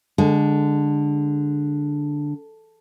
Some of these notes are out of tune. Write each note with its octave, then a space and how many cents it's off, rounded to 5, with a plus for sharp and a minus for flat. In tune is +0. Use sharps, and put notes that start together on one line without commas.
D3 +0 G#3 -15 G#5 +35